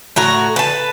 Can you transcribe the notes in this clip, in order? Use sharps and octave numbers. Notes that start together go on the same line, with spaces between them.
A2 F#4 A#5
B4 A5